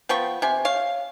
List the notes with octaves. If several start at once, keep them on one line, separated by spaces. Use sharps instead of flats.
F3 B3 G5 C#6
C3 G#5
C#5 F5